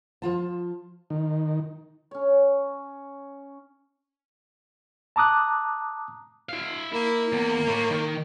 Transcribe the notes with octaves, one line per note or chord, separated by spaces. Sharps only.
F3 F4 A5
D#3
C#4 C#5
A5 A#5 D6 D#6 F#6
E4 F5
A#3 E4
E2
A2
D#3